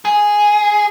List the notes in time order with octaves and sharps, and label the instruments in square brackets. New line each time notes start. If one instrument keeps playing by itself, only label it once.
[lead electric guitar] G#4